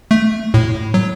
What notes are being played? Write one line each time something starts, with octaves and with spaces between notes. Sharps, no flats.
A3
A2
F#3